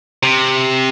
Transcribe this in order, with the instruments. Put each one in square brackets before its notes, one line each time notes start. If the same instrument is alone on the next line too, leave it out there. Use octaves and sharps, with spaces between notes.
[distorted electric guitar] C3